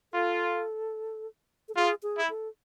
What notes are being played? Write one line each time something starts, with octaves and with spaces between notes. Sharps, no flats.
F4 A4
A4
F4 G#4
G#4
E4
A4